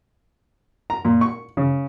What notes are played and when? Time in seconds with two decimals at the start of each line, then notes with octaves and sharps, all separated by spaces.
0.90 A#5
1.05 A#2
1.21 C#6
1.57 C#3